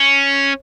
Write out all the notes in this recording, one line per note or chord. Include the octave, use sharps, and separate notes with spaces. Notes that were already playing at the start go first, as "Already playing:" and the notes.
Already playing: C#4